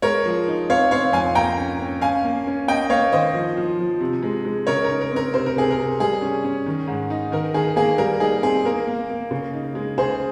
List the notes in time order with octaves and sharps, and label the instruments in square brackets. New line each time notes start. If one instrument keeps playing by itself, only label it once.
[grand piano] G#3 A#4 C#5
F3
D#4
C4 C#5 F5
C4 C#5 F5
F2 F5 G#5
A#3 G5 A#5
C#4
C#4
C#4 F5 G#5
A#3
C#4
A#3 D#5 G5
A#3 C#5 F5
D#3 C5 D#5
F3
F3
F3
C3
G#3
G#3
C#3 A#4 C#5
A#4
D#4
A#4
C4
A#4
C3 C5
A#4
C3 G#4
A#4
C3
G3 G#4
C#4
C#4
D#3
G#2
D#4
D#3 A#4
D#3 G#4
A#3 G#4
G3 A#4
D#4 G#4
C4 G#4
A#3 A#4
A#3
A#3
C#3
D#4
G#3
C#3 G#4 C5